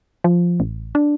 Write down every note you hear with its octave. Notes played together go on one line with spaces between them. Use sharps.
F3
A1
D4